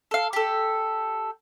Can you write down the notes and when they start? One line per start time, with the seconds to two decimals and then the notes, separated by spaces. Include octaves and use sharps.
0.11 A4 F5
0.33 G4 A4